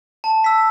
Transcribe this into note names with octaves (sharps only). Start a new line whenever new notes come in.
A5
E6 B6